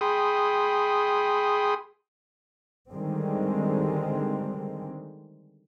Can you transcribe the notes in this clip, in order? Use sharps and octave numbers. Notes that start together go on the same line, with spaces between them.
G#4 G5 B5 C6 D#6
D3 D#3 G3 G#3 C4